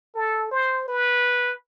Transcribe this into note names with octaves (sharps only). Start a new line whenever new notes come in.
A4
C5
B4